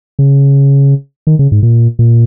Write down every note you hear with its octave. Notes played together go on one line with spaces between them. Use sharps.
C#3
D#3
C#3
G#2
A#2
A#2